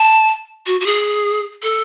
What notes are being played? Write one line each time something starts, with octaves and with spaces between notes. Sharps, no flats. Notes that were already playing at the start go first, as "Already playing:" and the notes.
Already playing: A5
F#4
F#4
G#4
A4